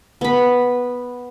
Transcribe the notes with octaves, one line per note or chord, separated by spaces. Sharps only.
B3 B5